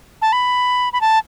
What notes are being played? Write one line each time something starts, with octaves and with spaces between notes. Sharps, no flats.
A5
B5
B5
A5